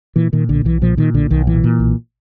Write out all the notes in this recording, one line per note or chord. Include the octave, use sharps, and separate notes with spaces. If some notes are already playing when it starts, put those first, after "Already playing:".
A#2 E3
A#2 D#3
B1 D3
B1 E3
A#2 F3
A#2 D#3
B1 D3
B1 D#3
A#2 E3
A#2
B1